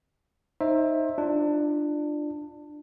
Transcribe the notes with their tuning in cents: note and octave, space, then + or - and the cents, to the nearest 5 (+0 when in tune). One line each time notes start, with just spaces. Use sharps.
D#4 +0 C5 +30 E5 +0
D4 +20 F4 -15